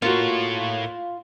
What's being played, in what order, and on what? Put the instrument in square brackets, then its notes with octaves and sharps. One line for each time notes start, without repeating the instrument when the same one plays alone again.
[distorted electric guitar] A2 C#5 [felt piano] A#3 F#4 [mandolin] F4